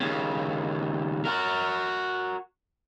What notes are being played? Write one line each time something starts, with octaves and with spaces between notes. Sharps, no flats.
D#2 C#3
F#4 A#4